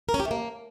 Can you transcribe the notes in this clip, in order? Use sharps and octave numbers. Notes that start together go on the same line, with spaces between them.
A#4
C#4
G4
A3
A#3